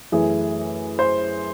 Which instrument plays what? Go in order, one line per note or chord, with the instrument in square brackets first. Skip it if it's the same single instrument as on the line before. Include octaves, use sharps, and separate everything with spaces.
[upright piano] F#2 E3 A3 G#4
C5